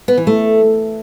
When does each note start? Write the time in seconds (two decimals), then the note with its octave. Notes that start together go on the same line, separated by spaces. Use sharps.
0.08 B3
0.17 E3
0.27 A3